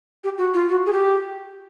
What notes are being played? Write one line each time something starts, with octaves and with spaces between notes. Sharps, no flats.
G4
F#4
F4
F#4
G#4
G4